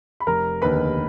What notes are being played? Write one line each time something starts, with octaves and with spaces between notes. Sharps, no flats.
B5
F1 A#4 A#5
D#2 D3 B4 B5